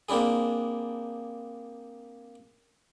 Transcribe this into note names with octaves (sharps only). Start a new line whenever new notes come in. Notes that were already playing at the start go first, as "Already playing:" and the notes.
A#3 C4 D4 E4 G#4